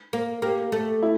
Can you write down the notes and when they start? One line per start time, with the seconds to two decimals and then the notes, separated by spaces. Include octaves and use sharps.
0.13 A#3
0.42 A#3 G4
0.72 A3
1.03 E4